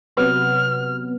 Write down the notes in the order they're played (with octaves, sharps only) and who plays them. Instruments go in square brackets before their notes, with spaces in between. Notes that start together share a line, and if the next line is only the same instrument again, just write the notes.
[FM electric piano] C3 F#3 B3 [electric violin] F6